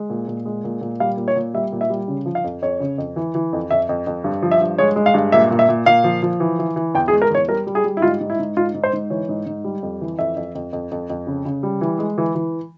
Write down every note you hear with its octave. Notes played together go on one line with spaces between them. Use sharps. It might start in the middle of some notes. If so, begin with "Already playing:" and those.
Already playing: G#3
A#2
A#2
G#3
A#2
A#2
G3 F5
A#2
C#5
A#2
G3 E5
A#2
E5
G3
C#3
F3
F5
F2
F2 C#5
C#3
F2
E3
E3
F2
F2 E5
F2
F2
G2
F3
E5
G2
G#3 C#5
G#3
F5
G2
A#2 E5
A#2
E5
A#2
A#2 F5
F3
F3
E3
E3
E3
E2 G5
G#4
G#3
A#4
E2 C#5
G3 A#4
G3
G#4
G3
E4
G#2 F4
G#2
E4
G#2
G#2 F4
G#2
C5
G#2
E3 C#5
G#2
G#2
G3
F2
E3
F2 E5
F2
F2
F2
F2
F2
C#3
C#3
G3
E3
G#3
E3
E3